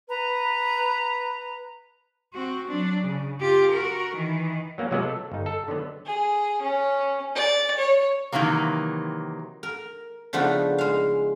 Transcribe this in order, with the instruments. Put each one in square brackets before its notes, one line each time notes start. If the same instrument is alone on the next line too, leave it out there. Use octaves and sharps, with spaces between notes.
[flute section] B4 A#5
[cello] C4 F#4
F#3 D4
C#3
F4 G4
F#4 A#4
D#3 E3
[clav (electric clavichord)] F#3 A#3 B3 C#4
C3 F3 F#3 G#3 B3
A4
G1 D#4
A4
D3 D#3 F#3 B3
[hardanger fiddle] G#4
C#4
D5
C#5
[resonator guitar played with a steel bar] C3 D#3 E3 F#3 A#3
[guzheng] A#4
C#3 F3 A3 B3 D4 D#4
G#3 F5